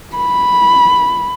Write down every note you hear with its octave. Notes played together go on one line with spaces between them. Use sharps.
B5